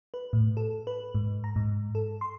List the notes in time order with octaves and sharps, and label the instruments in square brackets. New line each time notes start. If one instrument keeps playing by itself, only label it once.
[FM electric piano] B4
A2
A4
B4
G#2
A#5
G#2
A4
C6